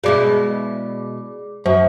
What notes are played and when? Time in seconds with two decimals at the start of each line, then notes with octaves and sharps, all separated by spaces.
0.04 B2 G#3 E4 G#4 D5 D6
1.66 F#2 C5